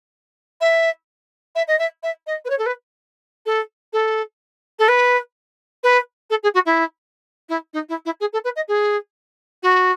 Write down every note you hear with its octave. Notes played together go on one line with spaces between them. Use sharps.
E5
E5
D#5
E5
E5
D#5
B4
C#5
A4
B4
A4
A4
A4
B4
B4
A4
G#4
F#4
E4
E4
D#4
E4
E4
G#4
A4
B4
D#5
G#4
F#4